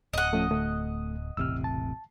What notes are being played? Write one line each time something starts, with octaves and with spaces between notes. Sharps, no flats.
D1 D#5 F#5
F3 A3 C#4
D2 A3
E1 A1 C3 E6 F6
A5